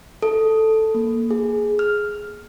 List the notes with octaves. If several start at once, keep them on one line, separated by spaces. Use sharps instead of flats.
A4
A#3
G#4
F6